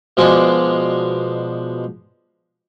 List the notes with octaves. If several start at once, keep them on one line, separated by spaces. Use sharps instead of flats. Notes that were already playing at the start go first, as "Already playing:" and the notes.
B2 F3 G#3 D4